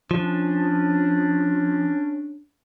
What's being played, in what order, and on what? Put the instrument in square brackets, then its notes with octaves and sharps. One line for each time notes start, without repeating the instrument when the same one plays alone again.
[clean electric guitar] F3 [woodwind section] C#4 D4